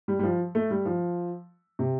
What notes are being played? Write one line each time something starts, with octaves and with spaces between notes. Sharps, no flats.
G3
G3
F3
A3
G3
F3
C3